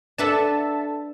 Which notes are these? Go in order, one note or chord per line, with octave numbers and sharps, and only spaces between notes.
D4 A4 B4 E5 F#5 A5